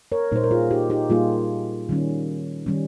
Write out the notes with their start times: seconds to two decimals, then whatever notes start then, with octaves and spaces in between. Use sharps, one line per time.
0.12 A#4 C#5
0.32 A#2 G3 A#3 D#4 C5
0.44 A#4
0.51 F4 G#4
0.71 D#4 G4
0.90 D#4 G4
1.10 A#2 G3 A#3 D#4 F4 G#4
1.89 D#3 G3 C#4
2.66 D#3 G3 C#4